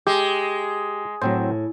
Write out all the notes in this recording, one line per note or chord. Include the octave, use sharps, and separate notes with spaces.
G#3 G4
A2 F#3 C4 C5